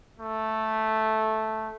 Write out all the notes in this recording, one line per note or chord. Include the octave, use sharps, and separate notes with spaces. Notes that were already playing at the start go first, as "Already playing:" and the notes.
A3